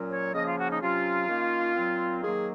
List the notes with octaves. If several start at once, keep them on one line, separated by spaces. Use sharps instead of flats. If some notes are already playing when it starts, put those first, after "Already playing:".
Already playing: A#2 F#3 C#4
C#5
C#3 F3 A#3 C#4 D#5
F4
F#4
D#4
C3 F#3 C#4 F4
D#3 A#3 C#4
A#2 F#3 C4
D#3 F#3 A#3 G#4